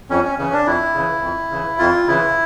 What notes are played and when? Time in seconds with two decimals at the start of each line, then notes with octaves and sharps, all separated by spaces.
0.10 F2 C#4
0.24 C#4
0.38 C#3 E3 C#4
0.52 D4
0.66 F2 E4
0.95 C#3 E3
1.22 F2
1.51 C#3 E3
1.79 F2 F4
2.07 C#3 E3 E4